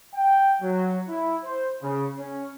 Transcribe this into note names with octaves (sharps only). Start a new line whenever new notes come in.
G5
F#3
E4
C5
C#3
C#4